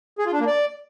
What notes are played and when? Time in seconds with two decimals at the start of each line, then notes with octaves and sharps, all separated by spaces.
0.18 G#4
0.26 F4
0.33 D4
0.40 A#3
0.47 D5